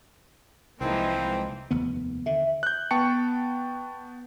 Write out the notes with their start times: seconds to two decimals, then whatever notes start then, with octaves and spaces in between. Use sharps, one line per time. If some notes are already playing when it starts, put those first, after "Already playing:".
0.81 C2 E3 F3 G#3 A#3 C4 D#4
1.71 F1 D#2 B3
2.26 D3 E5
2.63 F#6 G6
2.91 B3 G5 A5 C#6 C#7